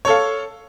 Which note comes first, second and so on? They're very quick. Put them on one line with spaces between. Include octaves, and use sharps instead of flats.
C#5 A4 F5